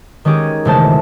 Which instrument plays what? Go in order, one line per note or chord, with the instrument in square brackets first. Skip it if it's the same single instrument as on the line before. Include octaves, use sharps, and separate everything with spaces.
[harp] D#3 G#3 C#4 G4 G#4
E1 C#3 G#3 A3 C5 A5